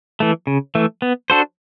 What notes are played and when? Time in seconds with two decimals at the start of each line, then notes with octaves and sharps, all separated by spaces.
0.20 E3 A3
0.47 C#3
0.75 E3 A3
1.02 B3
1.30 D4 F#4 A4 C5